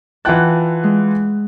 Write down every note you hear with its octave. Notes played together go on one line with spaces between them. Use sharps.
E3 F4 F#5 G5 A5 F#6
G#3